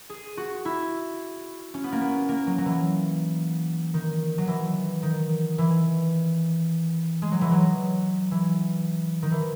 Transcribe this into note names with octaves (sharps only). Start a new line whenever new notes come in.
G#4
F#4
E4
C#4
B3
A#3
B3
A#3
F#3
F#3
E3
D#3
F#3
E3
D#3
E3
G#3
F#3
E3
F#3
E3
D#3
E3